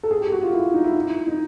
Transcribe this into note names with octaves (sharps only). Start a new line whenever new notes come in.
A4
G#4
G4
F#4
F4
E4
D#4
E4
D#4
D#4